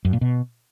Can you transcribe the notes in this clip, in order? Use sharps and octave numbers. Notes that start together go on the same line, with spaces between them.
F#2
A#2
B2